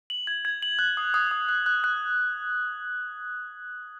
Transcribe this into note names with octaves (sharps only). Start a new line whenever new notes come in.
F#7
G#6
G#6
F#7
F#6
D#6
D#6
D#6
F#6
F#6
F#6